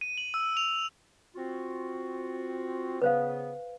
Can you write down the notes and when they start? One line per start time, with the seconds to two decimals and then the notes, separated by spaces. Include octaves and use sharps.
0.01 D#7
0.18 F#7
0.34 E6
0.57 F7
1.35 C4 F4 F#4
3.02 C#3 B3 B4 C5 F5